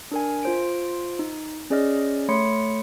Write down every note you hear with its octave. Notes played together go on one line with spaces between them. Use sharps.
D4 A#4 G#5
F4 C5 D7
D#4
C#4 G#4 D5 D#5 F6
A3 C#5 B5 C6 C#7